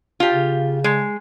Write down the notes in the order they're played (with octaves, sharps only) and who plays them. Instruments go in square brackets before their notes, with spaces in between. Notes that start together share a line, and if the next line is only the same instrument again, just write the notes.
[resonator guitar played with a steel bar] F4 G4
[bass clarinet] C#3
[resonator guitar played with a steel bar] G#3